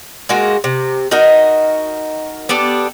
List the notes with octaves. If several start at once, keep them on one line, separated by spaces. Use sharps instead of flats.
G#3 A#3 F4 F#4
C3
D#4 F#4 A#4 D#5
B3 D4 G4 A4